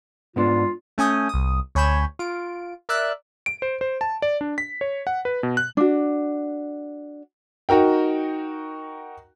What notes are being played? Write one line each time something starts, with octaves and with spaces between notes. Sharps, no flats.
G#2 B3 D4 F4
A3 C#4 G#5 D#6 G6
C2 D#6
D2 C#5 G#5 B5 G6 E7
F4 D7
A#4 D5 E5 E6 F#6
D7
C5
C5
A5
D5
D4
B6
C#5
F#5
B4
B2
F#6
D4 F#4
D#4 F#4 A#4 G5